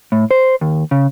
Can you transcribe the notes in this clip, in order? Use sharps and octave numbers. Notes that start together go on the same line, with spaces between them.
A2
C5
D#2
C#3